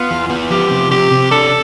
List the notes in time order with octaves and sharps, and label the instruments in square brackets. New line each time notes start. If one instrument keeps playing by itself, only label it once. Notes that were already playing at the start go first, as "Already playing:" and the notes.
Already playing: [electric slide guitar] B3 [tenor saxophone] F4
[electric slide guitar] E2
B3
[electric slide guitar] F3 [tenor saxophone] G4
[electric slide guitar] C3
[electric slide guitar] C3 [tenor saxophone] G4
[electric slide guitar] C3
[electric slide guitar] D4 [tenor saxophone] A4